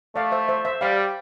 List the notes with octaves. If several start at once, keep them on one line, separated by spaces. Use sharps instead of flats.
A3 D5 F5
C5 E5
C5 E5
C5 E5
G3 D5 F5